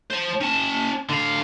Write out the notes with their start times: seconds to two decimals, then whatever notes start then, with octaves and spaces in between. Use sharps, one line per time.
0.11 C5 A5
0.41 C#4 A5
1.09 D3 F5